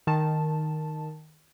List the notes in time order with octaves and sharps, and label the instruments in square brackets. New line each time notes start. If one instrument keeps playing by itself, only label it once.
[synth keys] D#3 A5